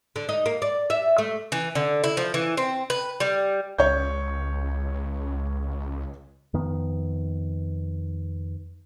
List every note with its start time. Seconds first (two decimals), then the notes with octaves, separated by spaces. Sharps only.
0.16 D3
0.29 D#4
0.46 A#3
0.62 D5
0.90 E5
1.18 A3
1.52 E3
1.75 D3
2.04 E4
2.17 F3
2.34 E3
2.57 C4
2.90 B4
3.20 G3
3.78 C#2 C#5 C#6 G6
6.54 F2 D#3 B3